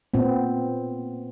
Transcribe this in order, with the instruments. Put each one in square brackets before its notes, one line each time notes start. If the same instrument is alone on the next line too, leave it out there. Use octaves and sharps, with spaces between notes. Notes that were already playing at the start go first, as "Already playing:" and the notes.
[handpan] A#2 B3 C4